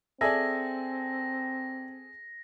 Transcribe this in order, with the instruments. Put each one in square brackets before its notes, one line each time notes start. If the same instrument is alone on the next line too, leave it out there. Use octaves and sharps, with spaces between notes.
[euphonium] C4 [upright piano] G#4 A4 G#5 [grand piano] D5 E5 [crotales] A#6